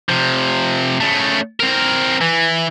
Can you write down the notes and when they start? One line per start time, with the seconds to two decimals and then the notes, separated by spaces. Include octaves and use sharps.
0.09 C3 F3
1.00 C#3 A3
1.60 C4 A#4
2.21 E3